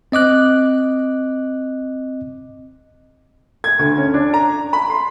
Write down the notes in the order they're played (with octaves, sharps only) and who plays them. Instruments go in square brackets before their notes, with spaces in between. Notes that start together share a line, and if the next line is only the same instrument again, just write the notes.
[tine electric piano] C4 D#5 D6 F#6
[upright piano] G#6
D2
C#4
D4
A#5
B5
C6